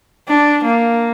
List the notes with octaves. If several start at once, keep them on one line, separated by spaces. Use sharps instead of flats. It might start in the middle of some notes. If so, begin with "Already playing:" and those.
D4
A#3